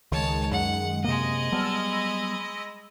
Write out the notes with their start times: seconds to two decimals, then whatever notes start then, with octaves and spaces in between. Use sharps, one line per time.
0.12 C#2 D#3 G#3 C#5 A5
0.51 F#2 F#5
1.04 F#2 C3 G#3 A#3 D#5
1.52 F#3 G3 B3 A5 E6 F6
1.89 B5 E6 A#6